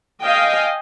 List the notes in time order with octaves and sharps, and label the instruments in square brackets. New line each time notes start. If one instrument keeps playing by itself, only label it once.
[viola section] D#5 F5 G5 G#5